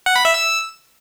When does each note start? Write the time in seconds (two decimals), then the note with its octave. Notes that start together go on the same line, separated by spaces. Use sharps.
0.06 F#5
0.16 B5
0.25 E5
0.34 E6